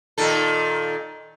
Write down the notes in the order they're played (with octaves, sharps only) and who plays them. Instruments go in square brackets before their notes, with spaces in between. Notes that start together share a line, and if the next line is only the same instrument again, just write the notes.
[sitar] A#2 D#3 A4